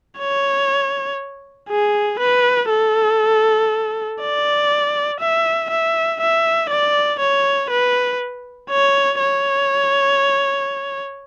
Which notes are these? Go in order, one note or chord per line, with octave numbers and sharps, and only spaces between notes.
C#5
G#4
B4
A4
D5
E5
E5
E5
D5
C#5
B4
C#5
C#5